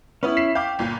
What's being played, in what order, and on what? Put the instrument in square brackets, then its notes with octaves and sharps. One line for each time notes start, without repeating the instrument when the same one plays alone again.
[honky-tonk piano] B3 B4 [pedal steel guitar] C#4 E4
[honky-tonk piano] B6 C7 E7
[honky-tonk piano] F5 D6 [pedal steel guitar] G5
[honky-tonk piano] G1 A#2